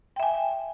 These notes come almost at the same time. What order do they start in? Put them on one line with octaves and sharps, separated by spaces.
G5 E5 G#5